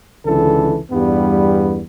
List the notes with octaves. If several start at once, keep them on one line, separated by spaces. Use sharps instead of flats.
C#2 D3 E3 A4
E2 G2 G3 B3